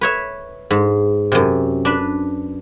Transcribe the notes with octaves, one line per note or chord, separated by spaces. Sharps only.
B4 C#5 E5
G#2
F#2 C3
D4 B4